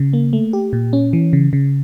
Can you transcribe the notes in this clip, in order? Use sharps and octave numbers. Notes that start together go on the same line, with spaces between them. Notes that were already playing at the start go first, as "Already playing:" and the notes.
Already playing: C#3
A#3
A3
G4
A#2
C#4
E3
C#3
C#3